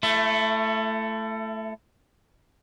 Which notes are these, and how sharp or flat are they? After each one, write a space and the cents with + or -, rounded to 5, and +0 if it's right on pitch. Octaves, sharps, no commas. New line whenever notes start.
A3 +0 E4 +35